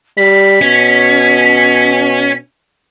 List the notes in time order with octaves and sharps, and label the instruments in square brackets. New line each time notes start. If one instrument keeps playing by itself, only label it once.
[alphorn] G3 [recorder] B6
[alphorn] B2 [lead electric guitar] C#4